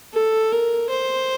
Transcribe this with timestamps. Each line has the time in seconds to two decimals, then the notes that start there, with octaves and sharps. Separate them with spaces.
0.13 A4
0.52 A#4
0.90 C5